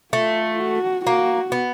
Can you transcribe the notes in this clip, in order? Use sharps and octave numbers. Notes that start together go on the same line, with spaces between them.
A3 F4
F#4
A#3 F#4
B3